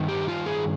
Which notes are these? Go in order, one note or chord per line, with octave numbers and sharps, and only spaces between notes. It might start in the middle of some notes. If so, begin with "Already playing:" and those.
Already playing: G2 D#3
G4
F4
G#4